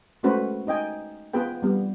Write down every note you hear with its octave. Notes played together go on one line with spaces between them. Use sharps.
G#3 A3 C#4 F#4 B4 C5
D#4 D#5 G5 G#5
B3 F4 G#4 B4 G5
G3 B3 G4